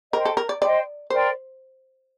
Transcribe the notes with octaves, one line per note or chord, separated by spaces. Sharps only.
A#4 C5 D#5 G5 C6
A4
A#4
D5
C5 D5 D#5 G5 C6
A#4 C5 D5 G5 C6